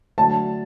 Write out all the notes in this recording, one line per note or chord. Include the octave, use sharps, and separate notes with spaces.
D3 F#3 A3 A5